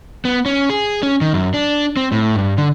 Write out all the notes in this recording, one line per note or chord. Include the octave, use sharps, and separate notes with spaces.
B3
C#4
G#4
C#4
D#3
F#2
D4
C4
A2
G2
D3